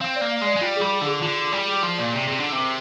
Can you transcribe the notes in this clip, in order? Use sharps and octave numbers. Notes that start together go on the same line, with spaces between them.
C4 F5
D5
A#3
F5
G#3
D5
G#3
G3 F4
G3 G#4
G#4
D3
G#4
D3 F4
F4
G3 D5
G#4
F3 F4
A#2 D5
C3 D5
C3 G#4
D3 A#5
C3
A#4